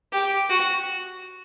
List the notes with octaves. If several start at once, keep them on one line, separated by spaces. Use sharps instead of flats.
G4
F#4